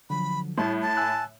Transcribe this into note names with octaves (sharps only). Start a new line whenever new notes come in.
D3 F3 F#3 B5
A2 G3 E4 A5
A5
G#5 E6 F#6